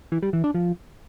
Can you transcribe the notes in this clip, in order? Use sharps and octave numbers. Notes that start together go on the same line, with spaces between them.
E3
G3
E3
D4
F3